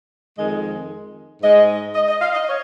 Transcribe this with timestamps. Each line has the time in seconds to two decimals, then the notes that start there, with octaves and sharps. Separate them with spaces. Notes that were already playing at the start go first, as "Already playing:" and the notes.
0.37 F2 D#3 G#3 D#5
1.43 G#2 G#3 D#5
1.95 D#5
2.08 D#5
2.21 F5
2.34 D#5
2.48 C#5